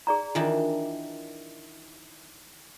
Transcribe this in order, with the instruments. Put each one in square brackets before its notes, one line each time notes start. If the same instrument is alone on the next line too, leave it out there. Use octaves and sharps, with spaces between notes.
[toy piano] G#4 D5 A#5
[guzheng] D#3 E3 D4 [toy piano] F4